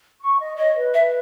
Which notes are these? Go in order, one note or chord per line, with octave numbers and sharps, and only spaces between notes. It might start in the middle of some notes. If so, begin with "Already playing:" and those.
C#6
D#5
C#5 D#5
B4
E5